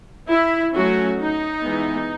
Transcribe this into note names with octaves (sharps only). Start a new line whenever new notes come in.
E4
F#3 A3 C#4 F#4
D#4
E3 G#3 B3